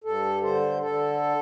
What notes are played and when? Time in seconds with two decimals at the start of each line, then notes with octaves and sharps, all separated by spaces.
0.04 G2 A4
0.43 D3 C5
0.82 D3 A4